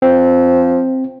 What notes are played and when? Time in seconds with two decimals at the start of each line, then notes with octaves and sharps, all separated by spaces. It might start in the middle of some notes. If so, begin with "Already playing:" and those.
0.02 F3 C4